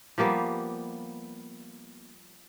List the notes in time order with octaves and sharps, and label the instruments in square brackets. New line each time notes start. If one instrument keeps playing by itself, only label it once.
[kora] F3 G3 A#3 B3